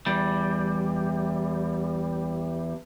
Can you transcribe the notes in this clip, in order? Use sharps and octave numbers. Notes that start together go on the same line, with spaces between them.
E2 G3